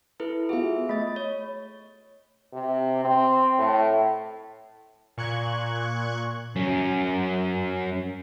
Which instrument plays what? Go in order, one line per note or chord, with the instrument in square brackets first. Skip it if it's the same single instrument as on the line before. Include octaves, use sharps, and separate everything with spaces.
[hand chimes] E4 A4 B4
[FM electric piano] B3 F4 F#4 [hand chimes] G#4 E5
[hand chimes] A3 A6 [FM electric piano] D#5 B5
[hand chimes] C#5
[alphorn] C3
C4
A2
[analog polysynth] A#2 C#6 F#6 G#6
[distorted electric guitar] F#2 C#4